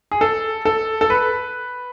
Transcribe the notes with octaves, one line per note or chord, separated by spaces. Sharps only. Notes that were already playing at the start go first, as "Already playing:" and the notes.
G#4
A4
A4
A4
B4